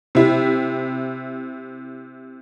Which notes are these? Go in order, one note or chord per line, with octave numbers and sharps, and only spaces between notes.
C3 E4